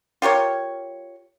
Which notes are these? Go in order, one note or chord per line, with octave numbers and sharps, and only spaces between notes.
F4 G4 A#4 C#5